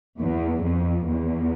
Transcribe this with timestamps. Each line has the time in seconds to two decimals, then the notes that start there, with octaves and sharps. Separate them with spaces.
0.19 E2
0.63 F2
1.07 E2